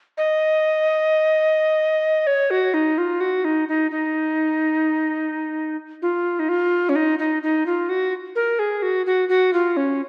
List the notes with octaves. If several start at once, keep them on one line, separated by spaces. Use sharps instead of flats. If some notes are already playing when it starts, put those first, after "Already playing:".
D#5
C#5
F#4
D#4
F4
F#4
D#4
D#4
D#4
F4
D#4
F4
C#4
D#4
D#4
D#4
F4
F#4
A#4
G#4
F#4
F#4
F#4
F4
C#4